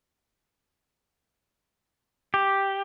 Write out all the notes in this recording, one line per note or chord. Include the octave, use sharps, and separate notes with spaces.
G4